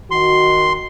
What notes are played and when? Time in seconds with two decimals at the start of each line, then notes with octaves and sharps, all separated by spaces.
0.11 D#3 F#4 C6